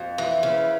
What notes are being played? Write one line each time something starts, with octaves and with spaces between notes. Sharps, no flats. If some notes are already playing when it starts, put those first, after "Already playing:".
Already playing: F2
E3
C#3